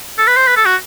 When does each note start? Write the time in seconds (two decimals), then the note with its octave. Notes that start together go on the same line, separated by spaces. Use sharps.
0.18 A4
0.27 B4
0.37 C5
0.47 B4
0.56 A4
0.66 F#4